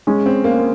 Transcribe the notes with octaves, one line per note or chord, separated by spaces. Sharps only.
G#3 C#4 G#4
C4
A#3